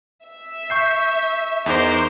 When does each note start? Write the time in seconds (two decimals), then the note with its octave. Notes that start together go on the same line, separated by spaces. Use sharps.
0.25 E5
0.70 C#6 G6 C7
1.66 E2 D#4 A#4 C5 D6